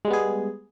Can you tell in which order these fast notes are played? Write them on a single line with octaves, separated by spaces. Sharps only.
G#3 G3 B3 G#4